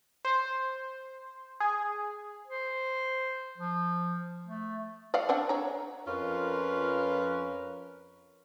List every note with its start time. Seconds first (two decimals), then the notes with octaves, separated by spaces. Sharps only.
0.25 C5
1.60 G#4
2.47 C5
3.58 F3
4.45 A3
5.14 D5 F5 F#5
5.29 C4 D4 F#5
5.49 C#5 A#5
6.08 F2 F3 C#4 F4 A#4 B4